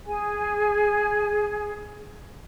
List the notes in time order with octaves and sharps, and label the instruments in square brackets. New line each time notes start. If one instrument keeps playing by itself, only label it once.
[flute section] G#4 G#5